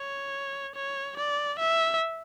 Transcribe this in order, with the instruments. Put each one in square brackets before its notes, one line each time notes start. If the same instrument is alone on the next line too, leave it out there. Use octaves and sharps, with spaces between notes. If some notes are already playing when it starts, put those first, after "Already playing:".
Already playing: [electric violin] C#5
C#5
D5
E5